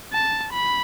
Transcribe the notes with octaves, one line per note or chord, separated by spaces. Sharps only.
A5
B5